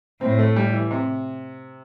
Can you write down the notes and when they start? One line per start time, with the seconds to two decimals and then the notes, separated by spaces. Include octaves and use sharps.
0.21 A2 C4
0.39 A3
0.56 G3
0.74 E3
0.91 C3